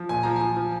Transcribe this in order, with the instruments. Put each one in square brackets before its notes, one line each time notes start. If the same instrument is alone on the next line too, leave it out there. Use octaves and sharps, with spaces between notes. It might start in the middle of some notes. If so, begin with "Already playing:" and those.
Already playing: [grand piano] F3
A#2 G#5
F3 A#5
G#5
F3
F3